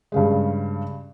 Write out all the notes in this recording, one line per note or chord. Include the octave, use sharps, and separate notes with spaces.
G2 C#3 G#3